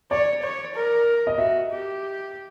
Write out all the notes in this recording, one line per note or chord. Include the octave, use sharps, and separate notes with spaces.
C#5 D5
C#5
A#4
D#5
F#4 E5
G4